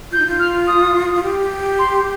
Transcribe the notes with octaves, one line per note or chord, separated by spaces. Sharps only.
F4 G6
D#4
F4
F6
D#6
F4
G4
C6